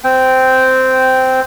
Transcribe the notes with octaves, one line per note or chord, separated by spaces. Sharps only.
C4 G5